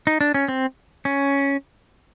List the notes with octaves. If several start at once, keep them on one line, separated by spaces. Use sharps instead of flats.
D#4
D4
C#4
C4
C#4